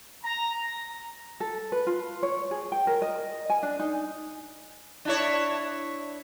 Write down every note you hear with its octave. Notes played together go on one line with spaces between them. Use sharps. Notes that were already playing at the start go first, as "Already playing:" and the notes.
A#5
A4
B4
F4
C#5
G#4
G5
A#4
D#5
G#5
D4
D#4
D4 E4 C#5